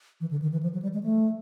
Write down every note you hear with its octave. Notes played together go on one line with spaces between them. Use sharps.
E3
D3
D#3
E3
F3
F#3
G3
G#3
A3